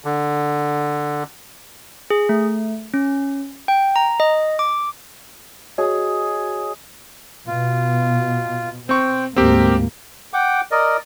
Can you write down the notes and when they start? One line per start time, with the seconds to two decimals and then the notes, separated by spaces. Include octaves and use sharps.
0.05 D3
2.10 G#4
2.29 A3
2.94 C#4
3.68 G5
3.96 A#5
4.20 D#5
4.59 D6
5.78 F#4 G#4 C#5 D#5
7.47 B2 F4
8.89 C4 C5 G5 C#6
9.36 D2 G#2 A#3 C4 G4 A#4
10.34 F#5 G5 D6
10.71 A#4 D5 D#5